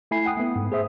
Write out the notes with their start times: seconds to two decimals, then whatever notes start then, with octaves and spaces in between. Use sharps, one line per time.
0.11 A3 E4 G#5 B5 C7
0.26 F#5 G5 D#6
0.37 A3 B3
0.56 G#2
0.72 G#4 C5 E5 D#6